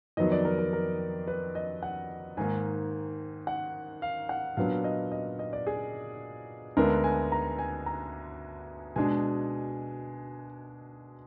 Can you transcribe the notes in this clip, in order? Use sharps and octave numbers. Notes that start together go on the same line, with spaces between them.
F2 D#3 F#3 B3 D#5
D5
A#4
A#4
A#4
B4
D#5
F#5
G#2 D#3 A#3 G#5
F#5
F5
F#5
A#2 F#3 B3 D4 F5
D#5
D#5
D#5
D5
G#4
D2 D3 G#3 B3 D4 A#4
G#5
A#5
G#5
A#5
B2 G#3 D4 G#5